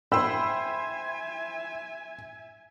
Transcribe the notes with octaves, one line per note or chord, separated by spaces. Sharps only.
C5 E5 G5 G#5 B5 E6